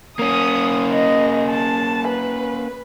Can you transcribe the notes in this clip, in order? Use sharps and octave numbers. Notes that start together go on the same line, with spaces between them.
A#3 C#4 D#6
D#5
A5
B4